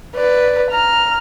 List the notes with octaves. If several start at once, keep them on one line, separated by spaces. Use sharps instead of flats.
B4 D5
A#5 F6